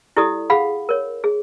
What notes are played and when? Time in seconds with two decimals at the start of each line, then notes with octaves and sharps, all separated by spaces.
0.17 E4 G4 A4 D5 D#6
0.50 G#4 F5 F#5 B5
0.89 A#4 C#5
1.24 G#4